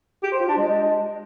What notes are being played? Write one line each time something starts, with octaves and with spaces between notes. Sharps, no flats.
G4
C5
F4
D4
G#3